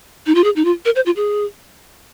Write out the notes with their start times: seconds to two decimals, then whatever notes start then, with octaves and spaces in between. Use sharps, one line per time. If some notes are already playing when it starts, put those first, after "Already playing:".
0.27 D#4
0.35 F4
0.44 G#4
0.56 D#4
0.65 F4
0.85 A#4
0.96 C5
1.06 F4
1.16 G#4